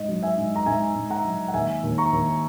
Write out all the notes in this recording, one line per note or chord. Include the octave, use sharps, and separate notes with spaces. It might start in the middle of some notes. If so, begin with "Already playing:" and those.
Already playing: G#2 D#5
F#3
E5 G#5
G#2
A#5
G#2 E5 G#5
G#2
F#5 A#5
F#3
F#5
D#2 E5 G#5
D#2
A#5 C#6
D#2